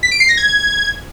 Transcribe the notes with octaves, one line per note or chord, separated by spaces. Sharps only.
B6
D7
C7
A#6
G#6